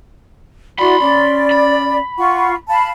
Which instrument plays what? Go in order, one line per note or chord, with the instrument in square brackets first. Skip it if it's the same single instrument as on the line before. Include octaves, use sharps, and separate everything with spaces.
[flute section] E4 F#4 D5 [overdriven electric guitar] B5 C6
[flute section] C#4 D5
[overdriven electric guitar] B5
[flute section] F4 F#5 C#6
F5 A5 B5